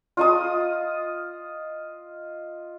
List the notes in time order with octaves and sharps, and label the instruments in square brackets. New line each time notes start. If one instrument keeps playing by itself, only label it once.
[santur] F4 D#5 D#6